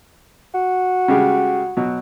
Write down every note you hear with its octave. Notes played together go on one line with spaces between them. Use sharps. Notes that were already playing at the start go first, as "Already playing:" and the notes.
F#4
C#3 G3 G#3
B2 F#3